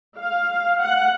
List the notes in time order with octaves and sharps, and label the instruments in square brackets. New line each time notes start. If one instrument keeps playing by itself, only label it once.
[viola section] F5
F#5